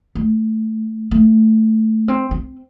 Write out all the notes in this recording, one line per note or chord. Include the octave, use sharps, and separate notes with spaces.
A3
A3
C4
C4